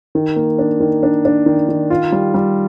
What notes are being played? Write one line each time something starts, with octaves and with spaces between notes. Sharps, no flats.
D#3
A#3
D4
D#3
D4
D4
D#3
D#3
F4
G3
G3